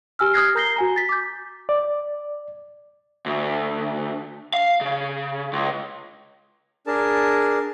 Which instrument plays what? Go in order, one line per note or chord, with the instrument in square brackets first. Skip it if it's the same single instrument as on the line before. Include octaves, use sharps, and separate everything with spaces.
[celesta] G4 G#5 E6 F6
D#6 F6 F#6 G#6 A#6 C7
A#4 A#5 G6 A#6 C7 G7
F#4 G#5 A#5
A6 B6
D6 G6
[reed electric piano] D5
[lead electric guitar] D2
F5
C#3
C#2
[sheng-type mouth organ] D4 G#4 A#4 A5